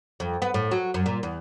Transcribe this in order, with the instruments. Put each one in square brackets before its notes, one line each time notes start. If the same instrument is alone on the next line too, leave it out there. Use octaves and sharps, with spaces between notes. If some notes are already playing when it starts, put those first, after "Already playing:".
[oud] F2
B3
A2
F#3
F#2
A#2
E2